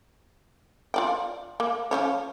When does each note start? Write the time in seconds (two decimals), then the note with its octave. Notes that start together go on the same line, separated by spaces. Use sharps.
0.94 F4 D5 G5
1.60 A#3
1.91 F3 C#4 C#5